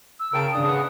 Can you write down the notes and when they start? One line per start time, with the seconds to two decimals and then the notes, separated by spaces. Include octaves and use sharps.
0.20 E6
0.33 C#3 A#4 G5 A5 D7
0.53 G#1 C#3 D4 A5 D#6
0.65 G#4 B4 F#5